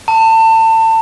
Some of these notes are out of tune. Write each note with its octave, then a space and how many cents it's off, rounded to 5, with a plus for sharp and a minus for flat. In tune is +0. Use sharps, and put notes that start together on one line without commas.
A5 +30